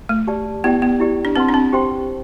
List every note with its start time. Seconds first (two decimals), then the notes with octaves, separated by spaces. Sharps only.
0.09 A3
0.27 G4 D5 A5
0.64 B3 E4 G4 D5 G5
0.82 B3
1.00 E4 G4 D5
1.25 D4
1.36 C4 B4 F#5 A5 C6
1.49 D4
1.54 C4
1.73 G4 C5 G5 C6